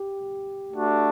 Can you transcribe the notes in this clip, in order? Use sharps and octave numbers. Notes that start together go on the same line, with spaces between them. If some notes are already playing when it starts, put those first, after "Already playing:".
Already playing: G4
A3 D4 F#4